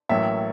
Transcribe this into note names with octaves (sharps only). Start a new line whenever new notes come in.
A1 A2 F#3 A#3 E5